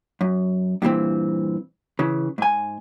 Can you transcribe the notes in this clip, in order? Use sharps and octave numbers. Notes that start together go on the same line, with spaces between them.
F#2
G2 A#2 E3 C4
C#3 E3
G#2 G#5